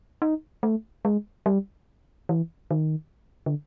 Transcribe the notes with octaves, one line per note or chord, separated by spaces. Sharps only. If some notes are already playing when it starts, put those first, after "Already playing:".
D#4
A3
G#3
G3
E3
D#3
D3